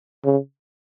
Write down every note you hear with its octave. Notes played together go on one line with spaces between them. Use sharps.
C#3